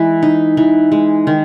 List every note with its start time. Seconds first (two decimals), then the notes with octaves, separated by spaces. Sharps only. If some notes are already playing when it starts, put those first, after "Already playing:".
Already playing: E3 G#3
0.23 D#4
0.57 E3
0.92 G#3
1.27 D#3